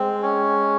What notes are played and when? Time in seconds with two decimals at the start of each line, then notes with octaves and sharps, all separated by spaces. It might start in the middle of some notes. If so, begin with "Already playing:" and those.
Already playing: G#3 C4
0.22 C#4